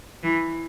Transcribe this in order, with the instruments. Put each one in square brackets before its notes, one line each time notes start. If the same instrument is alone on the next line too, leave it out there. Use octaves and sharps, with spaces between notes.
[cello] E3